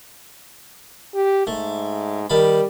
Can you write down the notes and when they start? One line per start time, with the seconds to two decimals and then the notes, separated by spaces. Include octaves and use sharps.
1.14 G4
1.47 G#2 A3
2.30 D#3 G3 A5 B5